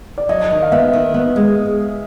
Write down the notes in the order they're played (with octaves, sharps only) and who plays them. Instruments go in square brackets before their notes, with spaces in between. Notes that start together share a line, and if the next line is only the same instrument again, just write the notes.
[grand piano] D5
[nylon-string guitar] F#3 [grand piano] D#5
[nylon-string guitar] D#3
[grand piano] F5
[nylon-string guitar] B3 [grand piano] E5
[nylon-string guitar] D#3
B3
G#3